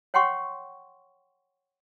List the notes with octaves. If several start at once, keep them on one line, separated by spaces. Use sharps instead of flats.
C#5 F#5 G5 C6 C#6